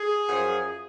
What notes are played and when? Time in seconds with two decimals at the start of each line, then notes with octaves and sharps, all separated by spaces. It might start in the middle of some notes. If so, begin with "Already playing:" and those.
Already playing: G#4
0.29 F#2 F3